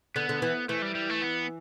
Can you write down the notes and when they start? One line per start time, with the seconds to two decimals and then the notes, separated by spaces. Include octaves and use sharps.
0.16 D3 B3
0.29 D3
0.42 E3
0.69 E3 A3
0.82 G3
0.95 G3
1.09 A3
1.22 B3